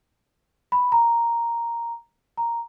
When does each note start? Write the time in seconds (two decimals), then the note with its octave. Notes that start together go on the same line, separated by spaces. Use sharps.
0.72 B5
0.92 A#5
2.37 A#5